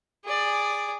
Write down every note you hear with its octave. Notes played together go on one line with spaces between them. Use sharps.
G#4 D5